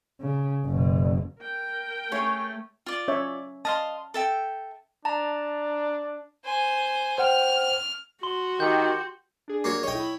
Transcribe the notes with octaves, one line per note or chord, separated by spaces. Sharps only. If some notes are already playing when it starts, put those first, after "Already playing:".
C#3
F#1 B2
A#4 G5
A3 C#4 G#4 C#5
F4 D5
C#4 C#5 E5
D#5 F5 A5 C6
A4 E5 G5
D4 A5 A#5
C5 G#5
C5 F#5 G5 F6
F#4 C6 G7
D#3 G4 G6
D4 G#4
A#3 F#4 C#5
B1 C#5 D#5 G5
E4 B5